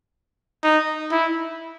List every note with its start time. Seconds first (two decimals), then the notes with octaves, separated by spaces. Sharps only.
0.63 D#4
1.12 E4